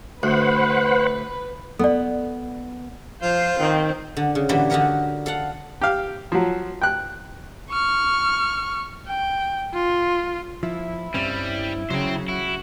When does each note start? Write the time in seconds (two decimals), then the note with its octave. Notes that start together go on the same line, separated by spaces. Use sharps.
0.23 D2 B4 C5 F#5
1.79 B3 A4 D5
3.22 F3 F4 C5
3.59 D#3 C4
4.17 D3
4.35 C#3
4.49 A2 D3 E3 G3 A#3 F#4
4.70 D3 D#4 F#4 G4 A#4 C#5
5.26 A4 F5 F#5
5.81 G4 F5
6.32 F3 F#3
6.82 G5 F#6
7.70 C#6 F6
9.08 G5
9.74 F4
10.63 F3 E4
11.14 G2 G3 C4 C#4
11.90 C#3 F#3 C5 G5
12.28 E4 F#4